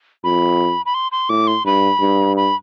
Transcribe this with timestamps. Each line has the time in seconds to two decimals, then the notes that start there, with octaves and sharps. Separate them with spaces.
0.24 F2 B5
0.86 B5
0.94 C6
1.12 C6
1.29 A2 D6
1.47 C6
1.65 G2 B5
2.00 G2
2.37 B5